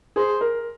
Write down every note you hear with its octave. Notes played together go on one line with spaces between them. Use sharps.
G#4 C5
A#4